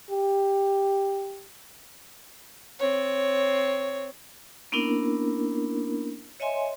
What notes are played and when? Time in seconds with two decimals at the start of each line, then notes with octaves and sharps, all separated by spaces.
0.11 G4
2.79 C4 C#5
4.72 A#3 B3 C#4 D4 E4 A#4
6.40 C#5 D#5 E5 G#5 C6